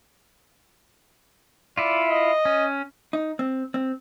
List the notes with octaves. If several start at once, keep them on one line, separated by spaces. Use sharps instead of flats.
E4 F4 D5
D#5
C#4
D#4
C4
C4